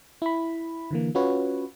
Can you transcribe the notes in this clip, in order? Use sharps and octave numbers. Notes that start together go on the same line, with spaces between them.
E4 B5
D3 E3 A#3
C#4 F4 F#4 B4 C#5